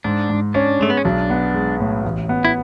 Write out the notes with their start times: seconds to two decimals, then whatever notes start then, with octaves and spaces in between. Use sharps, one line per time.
0.04 G#2 D4
0.29 G#2
0.54 C#4 D4
0.80 G#3 A3
0.90 B3
0.97 C#4
1.05 B1 D4
1.30 B3
1.54 G#3
1.80 A2
2.04 A1
2.29 B3
2.45 E4